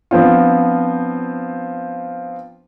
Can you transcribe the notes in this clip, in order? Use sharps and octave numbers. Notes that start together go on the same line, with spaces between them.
F3 B3 C4 D4 F4